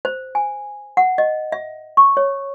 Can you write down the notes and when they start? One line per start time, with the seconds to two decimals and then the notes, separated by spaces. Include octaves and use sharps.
0.05 C5
0.35 G#5
0.97 F#5
1.18 D#5
1.52 E5
1.97 C#6
2.17 C#5